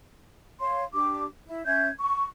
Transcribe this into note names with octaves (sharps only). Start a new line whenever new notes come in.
C#5 F5 C6
D4 G4 D6
E4
C#4 E5 G6 G#6
C#6